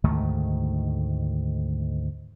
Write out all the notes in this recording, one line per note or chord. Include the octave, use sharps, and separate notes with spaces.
D2 G#2 D#3 A3